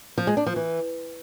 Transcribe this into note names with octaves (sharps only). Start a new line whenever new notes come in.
F3
G#3
D4
F3
E3